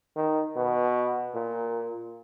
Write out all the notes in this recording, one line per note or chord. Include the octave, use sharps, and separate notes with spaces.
D#3
B2
A#2